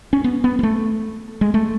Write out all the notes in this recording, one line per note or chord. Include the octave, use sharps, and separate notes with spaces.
C#4
B3
B3
B3
A3
G#3
A3